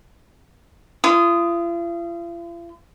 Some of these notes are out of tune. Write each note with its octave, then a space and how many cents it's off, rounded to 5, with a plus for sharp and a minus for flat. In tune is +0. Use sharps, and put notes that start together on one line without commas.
F4 -45 D#6 +0